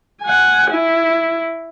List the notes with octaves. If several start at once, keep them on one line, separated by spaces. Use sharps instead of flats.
F#5 G#5
E4